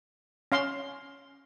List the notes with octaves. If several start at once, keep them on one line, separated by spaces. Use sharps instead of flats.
C#4 F5 C6